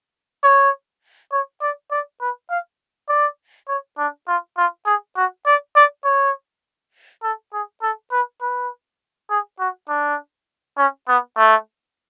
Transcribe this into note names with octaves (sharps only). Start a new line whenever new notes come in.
C#5
C#5
D5
D5
B4
F5
D5
C#5
D4
F4
F4
G#4
F#4
D5
D5
C#5
A4
G#4
A4
B4
B4
G#4
F#4
D4
C#4
B3
A3